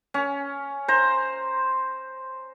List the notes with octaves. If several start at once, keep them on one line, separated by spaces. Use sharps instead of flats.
C#4
C5 A#5